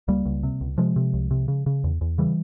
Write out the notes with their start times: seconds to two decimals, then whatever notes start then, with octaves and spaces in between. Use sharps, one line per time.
0.08 C#2 G3 A#3
0.25 C#2
0.43 C3
0.61 C#2
0.78 C3 F3 G#3
0.96 C3
1.13 C2
1.31 C3
1.48 C#3
1.66 C#3
1.84 E2
2.01 E2
2.18 C#3 E3 G3